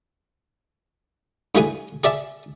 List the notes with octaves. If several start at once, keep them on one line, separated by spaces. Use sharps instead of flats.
G2 E3 A3 G#4 G#5
G#4 D5 E5 A5